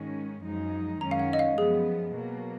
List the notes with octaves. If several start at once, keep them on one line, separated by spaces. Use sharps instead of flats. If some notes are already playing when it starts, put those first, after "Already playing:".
Already playing: G#2 D#3 G#3 C#4
F#2 F3 G#3 D#4
F#2 D#3 G#3 C#4 A#5
F5
F#5
D#5
F5
F#2 F3 B3 G#4
B2 F#3 A#3